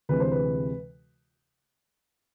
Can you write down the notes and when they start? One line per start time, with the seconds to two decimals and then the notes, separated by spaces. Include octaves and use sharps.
0.09 D2 C3 E3 G#3 B4
0.20 C5
0.31 B4